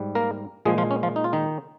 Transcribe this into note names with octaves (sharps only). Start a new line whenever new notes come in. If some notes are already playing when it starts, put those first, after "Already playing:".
Already playing: G#2 G3
A#3 A#4
A#2 F3 G#3 G#4
F3 F4
C#4
F3 F4
D#4
F4
D#3 D#4